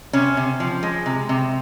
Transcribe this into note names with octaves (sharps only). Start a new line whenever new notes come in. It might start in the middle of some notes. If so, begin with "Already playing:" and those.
C3 C#4
C3
F3
G#3
C3
C3